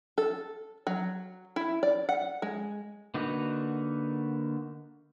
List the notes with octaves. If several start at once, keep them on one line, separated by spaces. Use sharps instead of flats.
A4
F#3
E4
D5
F#5
G#3
D3 A#3 D#4 F#4 B4